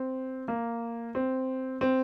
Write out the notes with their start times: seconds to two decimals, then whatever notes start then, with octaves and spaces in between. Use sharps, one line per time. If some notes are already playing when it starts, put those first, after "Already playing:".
Already playing: C4
0.48 A#3
1.15 C4
1.81 C4